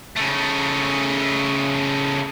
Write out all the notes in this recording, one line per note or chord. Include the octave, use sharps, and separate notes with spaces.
C#3 A3